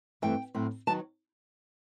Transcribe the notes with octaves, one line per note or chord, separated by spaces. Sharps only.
G2 E3 A3 C4 G5
A2 F#3 C4
D#3 F#3 B3 A5